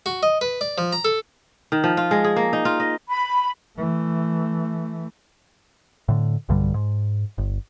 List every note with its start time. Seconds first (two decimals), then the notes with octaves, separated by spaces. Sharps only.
0.06 F#4
0.23 D#5
0.41 B4
0.61 D5
0.78 F3
0.93 A#5
1.05 A4
1.72 D#3
1.84 F3
1.97 F4
2.11 G#3
2.24 G#4
2.36 A#3
2.53 D#4
2.65 F4
2.80 D#5
3.09 B5
3.77 E3 A3
6.08 A2 D3
6.49 B1 G2 D3 G3
6.74 G#2
7.38 G1